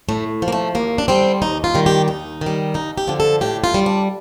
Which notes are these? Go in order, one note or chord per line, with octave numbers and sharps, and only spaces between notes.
A2 A3
F3
A#3
A3
D#2 A#3
D4
D3 G3 C4
D#2 D#4
F4
D#3 G3
G4
D#2 D#4
D#3
G3
D#2 D#4
G4
D3 F3
A4
A2 G4
F4
G3
D4